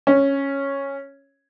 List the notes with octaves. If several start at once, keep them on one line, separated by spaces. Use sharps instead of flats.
C#4